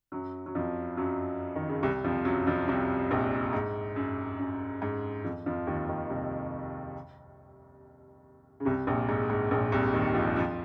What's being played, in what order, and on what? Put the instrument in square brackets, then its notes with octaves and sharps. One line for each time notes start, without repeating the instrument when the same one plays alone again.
[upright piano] F#2 F#3
F#3
F2 F3
F#2 F#3
D#3
C#3
C2 C3
F2 F3
F#2 F#3
F2 F3
C2 C3
A#1 A#2
G#2
F#2
F#2
G#2
F2 F3
F2 F3
D#2 D#3
D#2 D#3
C2 C3
C#3
C2 C3
A#1 A#2
G#2
G#2
A#1 A#2
C2 C3
D#2 D#3
F2 F3
F2 F3